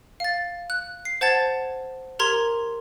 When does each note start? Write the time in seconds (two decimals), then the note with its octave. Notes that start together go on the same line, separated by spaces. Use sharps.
0.20 F5 A6
0.70 F#6
1.05 C7
1.21 C5 F#5 A5 G#6 A6
2.19 G4 A#4 A#5 C6 G#6